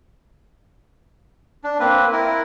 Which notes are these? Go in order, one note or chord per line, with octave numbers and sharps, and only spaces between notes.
D4
A#3 C4 B4
E4 A#4